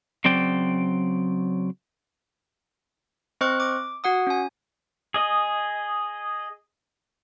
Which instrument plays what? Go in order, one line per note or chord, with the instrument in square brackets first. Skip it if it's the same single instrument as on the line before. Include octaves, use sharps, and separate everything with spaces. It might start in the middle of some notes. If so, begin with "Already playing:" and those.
[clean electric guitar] C#3 F#3 C4 D5 G5
[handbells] C4 C5 D#5 C#6 F6 F#6
D6
F#4 F#5 D#6
C#4 G#5
[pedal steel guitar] G#4 D#5